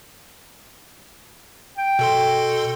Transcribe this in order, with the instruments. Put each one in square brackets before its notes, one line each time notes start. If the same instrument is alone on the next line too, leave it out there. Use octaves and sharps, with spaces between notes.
[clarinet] G5
[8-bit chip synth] B2 A4 C6